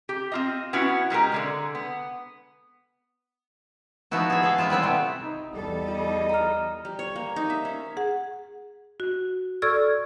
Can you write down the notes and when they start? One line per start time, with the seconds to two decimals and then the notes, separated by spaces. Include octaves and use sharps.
0.09 G4
0.32 C4 F4 D#5
0.73 B3 C#4 E4 F#4
1.10 B2 G#3 G4 A#4
1.32 D3 G#3 D5
1.75 B3
4.11 F3 B3 D#4 E4 F#4
4.30 G#4 E5
4.43 A4 E5 F5
4.58 G#3 E4 F4
4.70 G3 B3 C4 E4
4.82 C3 A3
5.22 C3 D#4
5.54 E2 G3 B3 D#4 A4
5.88 F4 D#5
6.29 A#5 F6
6.85 G3
6.99 C#5
7.16 A#3
7.36 D#4
7.50 E5
7.65 C#4
7.97 G#4 F#5
9.00 F#4
9.62 A4 D5 C#6 E6 F6 G#6